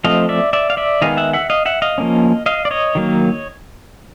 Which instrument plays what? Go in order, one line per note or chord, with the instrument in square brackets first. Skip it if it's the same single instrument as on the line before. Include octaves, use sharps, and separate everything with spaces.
[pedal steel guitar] F3 A3 C4 D#5 F5
D5 E5
D5 E5
F5
D5 E5
D#3 G#3 B3 D#5 F5
E5 F#5
E5 F#5
D#5 F5
E5 F#5
D#5 F5
F3 A#3 C#4
D#5 F5
D5
C#5 D#5
D#3 F#3 A#3